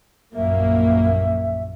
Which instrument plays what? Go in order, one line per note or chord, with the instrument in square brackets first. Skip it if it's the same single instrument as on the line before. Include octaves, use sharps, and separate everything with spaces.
[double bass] A#1 F#2 [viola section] A#3 [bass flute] E5